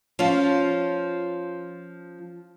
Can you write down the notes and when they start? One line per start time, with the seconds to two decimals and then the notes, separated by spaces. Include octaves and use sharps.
0.19 F3 C#4 F4